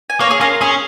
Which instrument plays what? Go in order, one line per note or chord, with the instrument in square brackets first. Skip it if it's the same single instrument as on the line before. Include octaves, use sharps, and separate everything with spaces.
[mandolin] G#5
[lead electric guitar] A#3 [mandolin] C#5 F5
[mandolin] G#4
[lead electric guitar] C#4 [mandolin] F4 A#4
[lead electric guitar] C#4 [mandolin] G#4 C#5